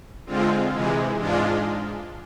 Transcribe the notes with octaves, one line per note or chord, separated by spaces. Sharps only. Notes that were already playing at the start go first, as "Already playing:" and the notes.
D3 G#3 C4 F4
C3 E3 G#3
G#2 G#3 D4 F4